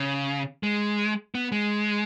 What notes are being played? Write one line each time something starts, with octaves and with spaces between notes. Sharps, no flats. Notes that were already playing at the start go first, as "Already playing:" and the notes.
Already playing: C#3
G#3
B3
G#3